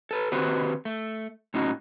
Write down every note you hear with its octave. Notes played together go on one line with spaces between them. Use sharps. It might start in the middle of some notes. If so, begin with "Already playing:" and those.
A4 B4
D#3 C4 F#4 G4 B4 C5
A3
A2 C#4 D#4 F#4